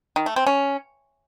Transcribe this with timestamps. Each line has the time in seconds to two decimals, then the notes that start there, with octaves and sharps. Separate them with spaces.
0.16 D#3
0.26 A3
0.36 C4
0.47 C#4